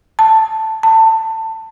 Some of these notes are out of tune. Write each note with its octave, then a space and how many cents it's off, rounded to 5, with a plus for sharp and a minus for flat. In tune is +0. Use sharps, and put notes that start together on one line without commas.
A5 +5
A5 +20